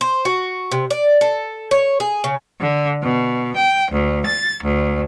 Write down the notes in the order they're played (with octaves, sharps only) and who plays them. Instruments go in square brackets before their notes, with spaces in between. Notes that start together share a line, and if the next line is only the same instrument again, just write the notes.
[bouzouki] C5
F#4
C3
D5
A4
C#5
G#4
C#3
[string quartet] D3
B2
G5
D2
A6
D2